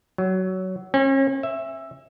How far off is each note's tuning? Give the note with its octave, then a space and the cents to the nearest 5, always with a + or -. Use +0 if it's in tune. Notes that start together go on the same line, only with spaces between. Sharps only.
F#3 +15
C#4 -40
E5 +5